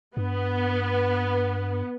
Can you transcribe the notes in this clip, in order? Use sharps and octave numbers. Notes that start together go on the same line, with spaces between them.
G2 B3